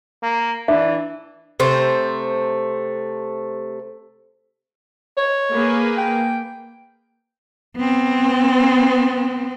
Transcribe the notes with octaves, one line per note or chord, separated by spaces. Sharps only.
A#3
E3 D4 E5
C3 A3 C5
C#5
A#3 G#4 B4
G5
B3 C4